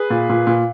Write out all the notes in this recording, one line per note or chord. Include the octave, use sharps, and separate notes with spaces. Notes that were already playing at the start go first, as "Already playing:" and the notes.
Already playing: G#4 B4
A#2
A#2
A#2